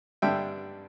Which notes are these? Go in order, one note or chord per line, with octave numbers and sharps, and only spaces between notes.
G2 D3 G3 E5 G5